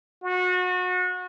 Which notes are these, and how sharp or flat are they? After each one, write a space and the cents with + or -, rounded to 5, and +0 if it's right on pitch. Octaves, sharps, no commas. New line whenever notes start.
F#4 -30